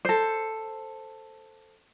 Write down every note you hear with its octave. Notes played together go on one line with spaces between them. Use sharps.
A4 C5